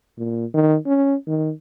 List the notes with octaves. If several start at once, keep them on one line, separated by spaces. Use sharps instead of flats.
A#2
D#3
C#4
D#3